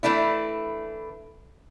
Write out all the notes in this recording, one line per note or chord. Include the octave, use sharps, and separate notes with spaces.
E3 A3 D4 E4